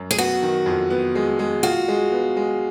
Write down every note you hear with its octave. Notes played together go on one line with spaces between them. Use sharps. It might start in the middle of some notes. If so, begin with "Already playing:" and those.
Already playing: F#2
G#4
B3 F#4
D#3
F2
B3
G#3
G#3
F4 F#4
G#3
B3
G#3